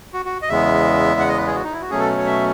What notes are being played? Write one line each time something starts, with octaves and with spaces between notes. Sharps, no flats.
F#4
F#4
D#5
E2 C#3 G#3 B3 E5
F#5
D#5
B4
G#4
F#4
D#4
E4
F#4
B2 F#3 A3 C#4 G#4
A4
C#5
E5